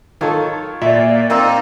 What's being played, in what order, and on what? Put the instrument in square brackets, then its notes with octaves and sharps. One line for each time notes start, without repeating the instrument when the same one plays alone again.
[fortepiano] D#3 A4 [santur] F4 C#5
[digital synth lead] A#2 [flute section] D5 [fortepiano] E5
[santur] A#3 C4 C5 [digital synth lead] D#4